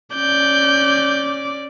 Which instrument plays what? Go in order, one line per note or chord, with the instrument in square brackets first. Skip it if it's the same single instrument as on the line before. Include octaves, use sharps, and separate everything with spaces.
[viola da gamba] C#4 D5 [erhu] G6